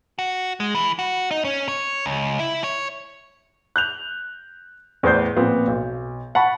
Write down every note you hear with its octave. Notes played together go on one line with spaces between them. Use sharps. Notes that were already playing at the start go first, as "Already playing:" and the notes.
F#4
G#3
E3
F#4
D#4
C#4
C#5
C#2
E4
C#5
F#6 G6 F7
E2 A2 B4 C5 D5 G6
A#2 F3 B3 C4
B1
F#5 A5 B5 C#6